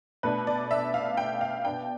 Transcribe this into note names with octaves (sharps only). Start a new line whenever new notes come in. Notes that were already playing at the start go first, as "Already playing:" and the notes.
B2 A3 D4 B4
D5
E5
F5
G5
F5
B2 B3 D4 G5